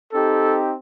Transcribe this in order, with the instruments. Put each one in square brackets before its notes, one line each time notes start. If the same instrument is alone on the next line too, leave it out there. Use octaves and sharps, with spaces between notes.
[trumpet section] C4 D#4 G4 A4